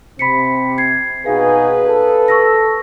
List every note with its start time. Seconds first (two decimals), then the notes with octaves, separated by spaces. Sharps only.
0.19 C3 C4 B5 B6 C#7
0.78 G#6 C7
1.26 B2 D#4 G#4 B4 F5
1.87 A4
2.28 C#6 E6 A#6